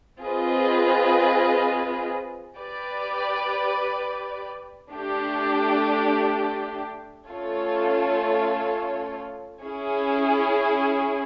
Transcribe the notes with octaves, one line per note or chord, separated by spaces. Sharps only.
C4 F4 G#4 B4 D#5
G4 B4 D5
A3 D4 G4
A3 C#4 F4 A4 C#5
C#4 E4 G#4